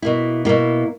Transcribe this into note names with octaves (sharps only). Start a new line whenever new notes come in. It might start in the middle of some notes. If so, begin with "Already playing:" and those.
B2 A#3 E4
B2 A#3 E4